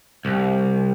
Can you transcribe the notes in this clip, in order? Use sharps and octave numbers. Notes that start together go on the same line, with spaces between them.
C2